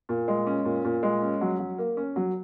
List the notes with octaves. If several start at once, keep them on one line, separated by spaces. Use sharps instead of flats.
A#2
G#3
C#4
A#2
A#2
G#3
C#4
F#3
F#3
A#3
C#4
F#3